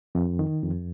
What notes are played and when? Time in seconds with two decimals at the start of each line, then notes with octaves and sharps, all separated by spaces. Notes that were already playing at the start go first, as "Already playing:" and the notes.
0.15 F2
0.39 D#3
0.63 F2